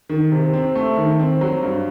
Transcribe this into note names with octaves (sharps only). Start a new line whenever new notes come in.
D#3
C3
C4
A3
D#3
C4
F#3
G2